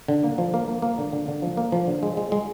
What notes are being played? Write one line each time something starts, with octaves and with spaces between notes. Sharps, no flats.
D3
A#3
F3
A#3
A#3
A#3
D3
D3
D3
F3
A#3
F3
D3
G#3
G#3
G#3